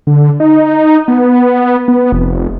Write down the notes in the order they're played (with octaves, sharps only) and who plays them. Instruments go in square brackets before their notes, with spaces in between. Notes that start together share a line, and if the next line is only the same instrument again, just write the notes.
[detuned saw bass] D3
D#4
B3
B3
F1